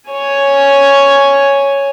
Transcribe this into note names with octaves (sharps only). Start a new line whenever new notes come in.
C#5 G#5